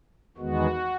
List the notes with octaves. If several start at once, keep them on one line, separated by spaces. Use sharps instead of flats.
E2 D#3 G#3 B3 F#4